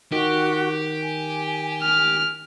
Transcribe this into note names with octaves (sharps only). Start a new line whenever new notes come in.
D#3 F#4 G4
G#5
F6